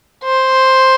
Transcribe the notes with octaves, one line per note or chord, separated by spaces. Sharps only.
C5